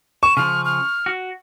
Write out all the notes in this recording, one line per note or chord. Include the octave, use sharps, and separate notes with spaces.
C#6 E7
C#3 F3 F6
F6
F#4